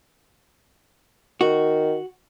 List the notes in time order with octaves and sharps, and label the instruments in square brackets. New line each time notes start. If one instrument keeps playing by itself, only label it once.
[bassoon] D#3 [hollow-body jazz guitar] F#4